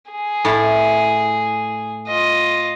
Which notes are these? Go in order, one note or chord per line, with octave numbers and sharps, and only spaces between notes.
G#4
A2 E4 A5
F4 D#5